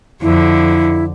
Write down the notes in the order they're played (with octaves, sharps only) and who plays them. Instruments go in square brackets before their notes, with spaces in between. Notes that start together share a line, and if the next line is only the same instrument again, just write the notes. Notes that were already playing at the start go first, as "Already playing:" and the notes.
[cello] F2 D3 [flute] E4